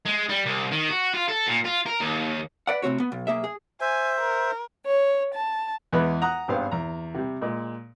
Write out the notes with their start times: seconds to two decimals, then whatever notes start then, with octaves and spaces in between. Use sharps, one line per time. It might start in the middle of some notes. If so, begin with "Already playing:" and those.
0.05 G#3
0.29 G3
0.45 C2
0.71 D#3
0.89 F#4
1.14 F4
1.28 A4
1.47 A#2
1.65 F4
1.86 A#4
2.00 D#2
2.67 B4 D5 F#5
2.82 A2 C3 C4 F#4 C#5
3.00 B3
3.12 B1
3.27 B1 A#3 G#4 E5
3.44 G#4
3.81 C5 E5 G#5
4.20 A#4
4.86 C#5
5.34 A5
5.93 E2 E3 G#3 B3 B5 F#6
6.21 F#5 A#5 D#6 F#6
6.48 G#1 G2 B3 C5 F5
6.71 E2 A#5
7.14 C3 G3
7.42 A#2 G#3